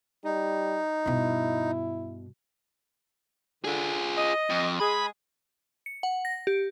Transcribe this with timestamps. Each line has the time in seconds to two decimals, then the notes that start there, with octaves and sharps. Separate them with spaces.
0.24 G3 D#4
1.06 G2 B2 E4
3.64 D3 F4 G#4
4.17 D#5
4.50 F2
4.80 G#3 G#4 B5
5.86 C#7
6.03 F#5
6.25 A#6
6.47 G4